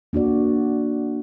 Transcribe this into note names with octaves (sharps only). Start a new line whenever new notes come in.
A#3 D4 F#4 D5